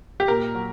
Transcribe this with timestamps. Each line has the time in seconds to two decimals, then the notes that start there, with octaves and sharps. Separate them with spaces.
0.20 G4
0.28 A#2 A#4
0.55 F#3